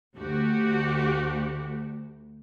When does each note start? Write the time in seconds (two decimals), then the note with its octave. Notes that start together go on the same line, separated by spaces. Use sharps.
0.17 D2 F#4 G4